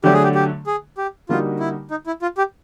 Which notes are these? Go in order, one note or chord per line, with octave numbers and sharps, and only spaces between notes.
D3 F#3 A3 D4 G4
G#4
G4
G4
G#4
G4
D3 G3 A#3 D#4 F4 F#4
E4
D#4
E4
F4
G4